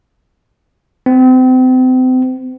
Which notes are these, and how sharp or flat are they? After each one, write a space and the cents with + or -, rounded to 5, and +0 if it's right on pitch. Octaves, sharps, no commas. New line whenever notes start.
C4 -35